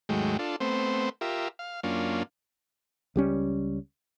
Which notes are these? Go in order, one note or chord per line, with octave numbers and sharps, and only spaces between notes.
D#2 G#2 F#3 G#3 A3 G5
D4 F4 A4
A3 B3 C4 C5
F4 G4 A#4 E5
F5
F#2 A#3 C#4 D4 F4
C#2 G3 C#4